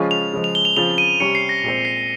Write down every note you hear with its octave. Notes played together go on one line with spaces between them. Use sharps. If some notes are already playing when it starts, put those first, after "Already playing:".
Already playing: C#3 F3 G#3 C#4 F4
F7
C#3 F3 G#3
F7
G7
F7
C#3 F3 C4 F4 F7
D#7
C3 G3 C#4 C#7
C7
A#6
A#2 G#3 C4
C7